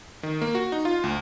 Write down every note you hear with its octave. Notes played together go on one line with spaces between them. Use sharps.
D#3
A#3
F#4
D#4
F4
D2